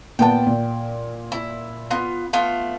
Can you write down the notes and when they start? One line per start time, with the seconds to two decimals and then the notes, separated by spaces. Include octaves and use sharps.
0.19 A#2 B3 G5 A5
0.47 A#2
1.32 E4
1.91 B3 F4
2.33 A3 B3 F4